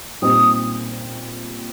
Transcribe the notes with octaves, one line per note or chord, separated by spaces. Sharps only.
A#2 G3 C4 D#4 D#6